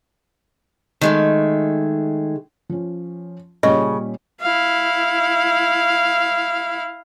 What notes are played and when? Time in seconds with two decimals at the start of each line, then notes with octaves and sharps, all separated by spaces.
1.01 D#3 G#3 A3
2.70 F3 C#4
3.63 A#2 C#3 G3 C#4 D#5
4.41 E4 F5